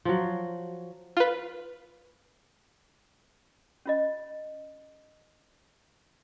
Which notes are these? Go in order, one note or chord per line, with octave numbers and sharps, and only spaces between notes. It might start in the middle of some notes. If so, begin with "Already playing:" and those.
F3 F#3
F4 B4
C#4 F4 D#5